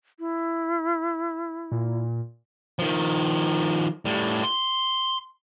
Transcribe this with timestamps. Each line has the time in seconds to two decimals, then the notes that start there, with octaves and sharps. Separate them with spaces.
0.19 E4
1.72 A#2
2.79 D#3 F3
4.05 A2 G3
4.44 C6